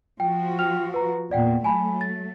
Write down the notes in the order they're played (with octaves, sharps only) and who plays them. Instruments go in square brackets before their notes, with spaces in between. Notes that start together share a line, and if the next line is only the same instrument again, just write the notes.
[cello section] F3 F#4 [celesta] G5
[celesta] G5 F6 F7
B4 A#5
[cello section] E2 A#2 [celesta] D5 F#5 G5
[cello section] F#3 A3 [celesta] G#5 A5 B5
[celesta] A6